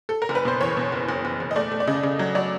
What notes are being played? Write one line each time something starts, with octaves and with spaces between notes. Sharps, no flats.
A4
A#4
F#1
B4
B2 C5
E2 C#5
B2
F#1
F#1
F#1
F#1
D#5
A3 D5
A3
D5
C#3 D#5
C#3
F#3
F#3 D5